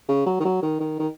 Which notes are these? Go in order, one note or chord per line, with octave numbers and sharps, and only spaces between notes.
C#3
F#3
D#3
F#3
D#3
D#3
D#3